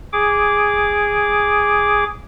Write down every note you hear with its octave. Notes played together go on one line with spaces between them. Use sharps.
G#4 D6